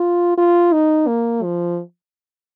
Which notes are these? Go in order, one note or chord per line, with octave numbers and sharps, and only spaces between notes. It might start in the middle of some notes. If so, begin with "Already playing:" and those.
Already playing: F4
F4
D#4
A#3
F3